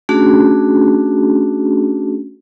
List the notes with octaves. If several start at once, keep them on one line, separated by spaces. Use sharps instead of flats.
A3 C#4 D4 F#4 G#4